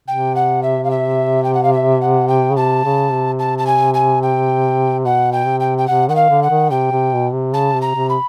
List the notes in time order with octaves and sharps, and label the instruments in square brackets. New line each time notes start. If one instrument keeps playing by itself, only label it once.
[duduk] C3 [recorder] G5
[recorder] F#5
E5
F5
E5
G5
F#5
F5
E5
F#5
G5
[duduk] C#3
[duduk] C3 [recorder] A5
[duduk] C#3
C3
[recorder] A5
A5
G#5
G#5
G5
[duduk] B2 [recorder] F#5
[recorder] G5
[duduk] C3
[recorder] G5
G5
[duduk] C3 [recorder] F#5
[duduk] D#3 [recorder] F#5
[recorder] F5
[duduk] D3
[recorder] F#5
[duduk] D#3
[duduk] C3 [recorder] G5
[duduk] C3
B2
C3
[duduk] C#3 [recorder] A5
[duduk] C3
[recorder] A#5
[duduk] C3
[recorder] B5